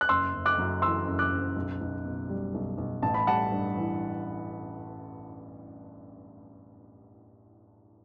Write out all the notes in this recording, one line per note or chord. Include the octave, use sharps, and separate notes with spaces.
F#6
F#1 C6 E6
F#1
D6 F#6
F#2
E3 C6 E6
F#1
D6 F#6
F#1
B1
B1
B2
G3
B1
B1
A1 A5
B5
G3 F#5 A5
G2
E3